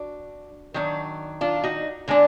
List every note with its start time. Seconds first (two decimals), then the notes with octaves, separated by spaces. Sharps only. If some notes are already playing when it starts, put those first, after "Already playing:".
Already playing: D4 F#4
0.74 D#3 F#3 D4
1.41 D4 F4
1.63 D#4 F#4
2.08 D3 G#3 D4